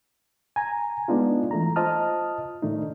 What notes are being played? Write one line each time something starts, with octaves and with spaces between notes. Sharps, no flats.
G#5 A#5
G#3 B3 D4 D#4 F4
E3 A3 A#5
F4 C5 D#5 A5 D#6 F6
A2 D#3 A3 D4 D#4